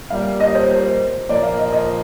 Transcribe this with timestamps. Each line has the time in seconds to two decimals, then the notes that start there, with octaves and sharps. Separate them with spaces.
0.10 A#2 G3 A#3 F5
0.40 D#5
0.55 C5
0.70 C5
1.28 A#2 F3 A#3 D5
1.43 F5
1.58 D#5
1.73 D#5